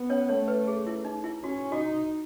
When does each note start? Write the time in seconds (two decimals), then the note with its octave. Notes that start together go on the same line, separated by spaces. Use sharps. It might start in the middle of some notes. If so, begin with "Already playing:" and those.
Already playing: B3
0.10 C#4 C#5
0.29 A3 C#4 C#5
0.48 B4
0.67 G#4
0.87 E4
1.05 D#4
1.24 E4
1.43 C#4 F#4
1.72 D#4 F#4